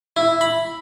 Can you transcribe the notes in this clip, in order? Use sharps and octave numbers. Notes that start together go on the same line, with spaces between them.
E4
B5